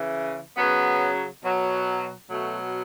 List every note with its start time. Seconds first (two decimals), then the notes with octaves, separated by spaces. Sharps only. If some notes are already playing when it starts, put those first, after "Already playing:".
Already playing: C#3 E3
0.57 C#3 F#3 B3
1.43 B2 F#3
2.30 B2 F#3 A3